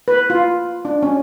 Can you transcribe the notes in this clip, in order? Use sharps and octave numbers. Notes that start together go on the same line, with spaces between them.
B4
F4
D4
C#4